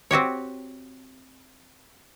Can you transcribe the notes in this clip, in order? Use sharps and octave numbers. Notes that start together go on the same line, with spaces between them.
C4 F#4 G4 C#5